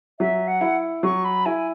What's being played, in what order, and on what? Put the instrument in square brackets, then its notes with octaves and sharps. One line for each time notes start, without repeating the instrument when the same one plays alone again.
[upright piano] F#3 [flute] E5
[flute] F#5
[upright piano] E4
[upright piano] F#3 [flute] C#6
[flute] B5
[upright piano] E4 [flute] G#5